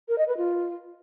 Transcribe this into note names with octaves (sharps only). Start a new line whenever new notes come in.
A#4
D#5
B4
F4